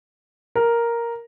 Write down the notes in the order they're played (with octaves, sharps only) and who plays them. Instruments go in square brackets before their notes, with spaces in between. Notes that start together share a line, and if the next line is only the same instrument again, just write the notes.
[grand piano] A#4